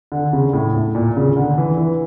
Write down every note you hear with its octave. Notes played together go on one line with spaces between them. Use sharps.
D3
C#3
A2
A2
A#2
C#3
D3
E3
E3